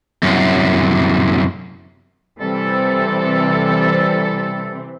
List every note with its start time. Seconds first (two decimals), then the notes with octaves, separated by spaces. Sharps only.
0.23 C2 F#2
2.41 C3 E3 G3 C4 A4